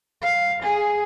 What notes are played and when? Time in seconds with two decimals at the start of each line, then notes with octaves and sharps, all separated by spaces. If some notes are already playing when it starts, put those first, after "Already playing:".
0.23 F5
0.63 G#4